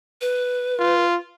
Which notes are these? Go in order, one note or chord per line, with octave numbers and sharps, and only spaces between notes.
B4
F4